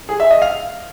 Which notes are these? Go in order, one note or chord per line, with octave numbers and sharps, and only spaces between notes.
G#4
E5
D#5
F5